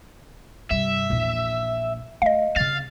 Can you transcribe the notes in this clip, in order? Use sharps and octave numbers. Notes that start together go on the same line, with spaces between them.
G2 C3 E5
A#1 E2
A3 D#5 F5
C#3 C4 F5 A6